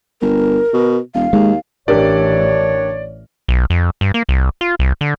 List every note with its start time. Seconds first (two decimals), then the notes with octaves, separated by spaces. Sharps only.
0.22 G1 A#4
0.74 B2
1.14 E1 F5
1.33 D#2 G#3
1.88 A1 E3 D4 G4 A#4 C#5 D5
3.48 B1
3.70 F2
4.01 G2
4.14 A#3
4.29 C2
4.61 F4
4.79 C2
5.01 D3